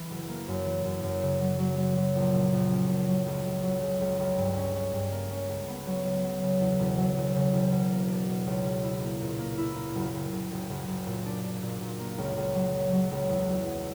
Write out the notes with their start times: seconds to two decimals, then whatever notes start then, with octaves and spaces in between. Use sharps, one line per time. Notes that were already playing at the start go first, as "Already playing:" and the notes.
Already playing: E3
0.10 F#1
0.29 A#3
0.48 F#2
0.66 E3
0.85 F#2
1.03 F#2
1.22 C#3
1.41 F#3
1.59 F#3
1.78 F#3
1.97 F#3
2.15 A#1
2.34 A#2
2.52 A#1
2.71 C#4
2.89 A#1
3.08 F#3
3.27 C#2
3.45 C#2
3.63 F#3
3.82 C#3
4.01 C#2
4.20 C#2
4.38 G2
4.56 C#4
4.75 C#4
4.93 G2
5.12 A#3
5.31 C#4
5.49 C#2
5.68 B3
5.86 F#3
6.05 C#2
6.24 F#3
6.42 C#3
6.61 E2
6.79 E1
6.98 F#3
7.17 E1
7.35 C#3
7.53 E1
7.72 B2
7.90 A#3
8.10 D4
8.28 B2
8.46 C#2
8.65 B2
8.84 E4
9.02 A#3
9.21 A#2
9.39 A#3
9.58 E4
9.76 A#3
9.95 F#1
10.13 F#1
10.32 F#1
10.51 F#1
10.69 F#1
10.88 F#1
11.06 A#2
11.25 D4
11.44 D4
11.62 A#2
11.81 A#2
11.99 A#3
12.18 C#2
12.37 C#2
12.55 F#3
12.74 F#3
12.92 F#3
13.11 C#2
13.30 E2
13.48 F#3
13.66 E2